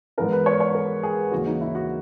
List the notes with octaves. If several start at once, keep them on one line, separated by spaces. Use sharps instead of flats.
G#2 E3 B3 A#4
B4
C#5
C#5
A#4
G#4
D#2 C#3 E3 A#3 F#4
D#4
E4
F#4